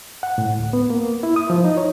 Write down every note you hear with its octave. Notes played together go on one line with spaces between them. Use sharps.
F#5
A2
D2
B3
A#3
E4
D#6
F3
D#4
C#5